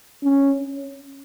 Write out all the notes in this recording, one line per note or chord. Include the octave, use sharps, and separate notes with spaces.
C#4